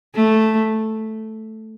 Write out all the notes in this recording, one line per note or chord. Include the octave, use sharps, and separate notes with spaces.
A3